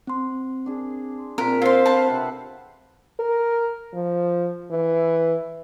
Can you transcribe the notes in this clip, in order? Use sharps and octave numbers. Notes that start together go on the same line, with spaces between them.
C4 C6
D4 G#4
A#2 C4 F4 A#4 A5 B6
F4 A4 C5 F5 C6
B4 A5
C3 F#5
A#4
F3
E3